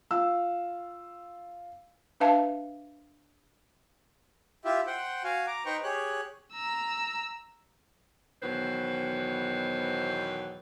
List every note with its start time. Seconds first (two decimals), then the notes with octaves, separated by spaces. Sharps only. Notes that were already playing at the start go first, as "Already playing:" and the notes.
0.11 F4 F5 E6
2.20 D4 B4 E5 F5 A5
4.65 E4 F4 G4 E5
4.87 C5 F#5 G5
5.24 F#4 F5 G#5
5.47 A#5 D6
5.66 D#4 B4 C5 G5 A#5 C#6
5.83 G4 G#4 C#5 F#6
6.53 A#5 E6
8.43 E2 B2 D#3 F#3 B4 C5